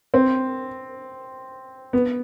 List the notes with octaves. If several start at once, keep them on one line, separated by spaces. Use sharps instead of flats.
C4
B3